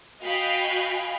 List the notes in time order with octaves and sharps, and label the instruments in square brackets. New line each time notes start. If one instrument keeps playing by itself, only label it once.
[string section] F#4 D#5 F5 G5 G#5 B5